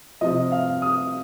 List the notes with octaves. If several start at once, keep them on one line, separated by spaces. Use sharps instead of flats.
C3 F3 D#5
F5
D#6